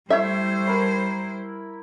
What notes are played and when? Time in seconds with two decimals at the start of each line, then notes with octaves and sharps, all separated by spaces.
0.10 G3 A3 E4 C5 E5
0.67 A#4 B5